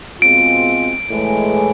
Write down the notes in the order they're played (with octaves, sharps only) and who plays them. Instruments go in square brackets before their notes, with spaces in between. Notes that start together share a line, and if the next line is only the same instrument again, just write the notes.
[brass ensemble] B2 G#3 C4 F4 [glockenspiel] D7
[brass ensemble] A2 E3 G#3